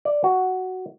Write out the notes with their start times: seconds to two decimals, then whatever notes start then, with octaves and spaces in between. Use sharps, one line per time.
0.05 D5
0.24 F#4